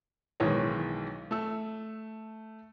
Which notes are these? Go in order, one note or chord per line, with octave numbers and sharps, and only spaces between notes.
B1 D#3 E3 G#3 C#5
A3 E6